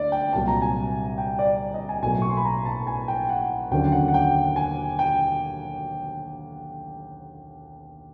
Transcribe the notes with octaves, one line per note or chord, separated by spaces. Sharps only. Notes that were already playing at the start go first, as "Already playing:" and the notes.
Already playing: D2 D5
G5
C2 A#2 F#3 A5
A#5
G#5
G5
D5
D#5
G#5
B1 A2 F#3 A#3 G#5
C#6
C6
B5
A#5
A5
G#5
G5
F#5
D#2 D3 F#3 A#3 C#4 G5
F#5
F#5
G5
G#5
G5